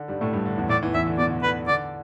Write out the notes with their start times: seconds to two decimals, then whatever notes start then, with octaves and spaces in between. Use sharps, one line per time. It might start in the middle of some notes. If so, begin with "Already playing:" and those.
Already playing: D3
0.08 G2 G3
0.21 A2 A3
0.33 G2 G3
0.45 D3
0.57 E2 E3
0.69 A2 A3 D5
0.82 E2 E3
0.94 E2 E3 E5
1.06 D3
1.18 B2 D5
1.30 D3
1.43 D3 B4
1.68 D3 D5